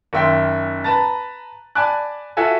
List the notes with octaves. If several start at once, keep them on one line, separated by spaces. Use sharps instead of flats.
F#1 D#3 E5 G5 C6
B4 A5 A#5 A6
D5 G#5 A5 B5 D6 F#6
F4 F#4 A4 E5 G#5